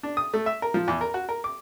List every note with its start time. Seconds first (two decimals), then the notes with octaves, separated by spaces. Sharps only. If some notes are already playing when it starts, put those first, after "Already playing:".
0.03 D4
0.17 D#6
0.34 A3
0.46 E5
0.62 A#4
0.74 F3
0.88 E2
1.01 A#4
1.14 F#4
1.29 A#4
1.44 D6